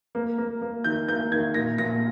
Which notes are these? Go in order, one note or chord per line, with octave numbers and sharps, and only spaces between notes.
A#3
A#3
A#3
D#3 G6
A#3 G6
D#3 G#6
A#2 A#6
A#2 A#6